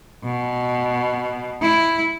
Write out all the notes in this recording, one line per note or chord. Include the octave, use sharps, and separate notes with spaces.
B2
E4